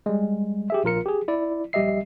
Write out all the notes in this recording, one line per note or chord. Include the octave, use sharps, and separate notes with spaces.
G3 G#3
G4 G#4 E5
A#1 F4 A#4 C#7
G4 G#4
E4 D5
A#1 G3 G4 D#5 E5 C7